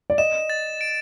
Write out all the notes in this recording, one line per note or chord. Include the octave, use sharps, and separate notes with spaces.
D5
D#5 E7
A6
D7